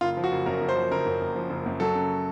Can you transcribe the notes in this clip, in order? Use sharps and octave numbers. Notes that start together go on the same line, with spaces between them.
F#1 F4
F3
F#4
F#1
F#2 A#4
F#1
C5
F3
F#1 A#4
F#2
F#1
F3
F#1
F#2
F#3 A4
C#3